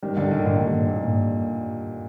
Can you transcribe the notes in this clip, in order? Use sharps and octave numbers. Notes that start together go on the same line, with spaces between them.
D#3 G3
D3 G3
A#2 D#3
A#2 D3
D#3 G3
A#2
A#2
A#2